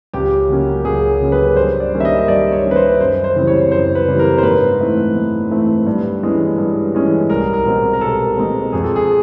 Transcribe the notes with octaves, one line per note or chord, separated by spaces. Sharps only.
C#2 G4
C#3 F#3 A#3 C#4
C#2 G#4
C#3 F#3 A#3 C#4
B4
G2 C5
D5
D#3 G3 A#3 C#4
E5
D#5
D#5
G2 D5
C#5
D#3 G3 A#3 C#4
B4
C5
F#2 C5
C5
C#3 E3 G3 C4
C#5
F#2 C5
B4
C#3 E3 G3 C4
A#4
C5
G#2 B4
E3 A3 C4
G#2
E3 A3 C4
G2
E3 G#3 C#4
G2
E3 G#3 C#4
C2 A#4
A#4
B2 G#3 C4
A#4
C2 A4
B2 G#3 C4
F2 G#4
A4
G#4